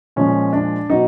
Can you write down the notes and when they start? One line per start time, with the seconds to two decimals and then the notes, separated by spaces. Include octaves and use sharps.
0.16 A#2 F3 G#3 C#4
0.53 D4
0.90 B2 F#3 D#4